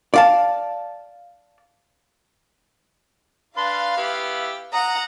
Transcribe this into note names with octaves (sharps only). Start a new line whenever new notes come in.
D5 F5 A5
D4 B4 F5 C6
B3 E4 G4
F#5 A#5 D#6